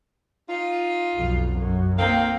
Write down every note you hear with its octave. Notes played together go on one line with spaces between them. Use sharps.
D#4 F4
B1 F2
F#2
D#3 A#3 C4 F5